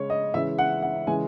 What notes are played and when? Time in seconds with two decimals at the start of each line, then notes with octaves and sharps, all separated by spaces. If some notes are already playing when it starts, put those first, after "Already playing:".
Already playing: C#3 G#3 C#5
0.10 D#5
0.34 C#3 E3 G#3 E5
0.58 F#5
0.82 F#5
1.07 C#3 E3 G#3 G#5